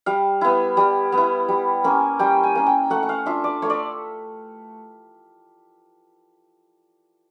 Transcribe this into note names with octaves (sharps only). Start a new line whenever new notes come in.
G3 F5
B3 E4
G3
B3
E4
G3
A#3 C#4
G3 G5
G#5
A#3 C#4
G5
A3 F#5
F#5
F5
D4 F4 E5
D5
A3 C#5
D5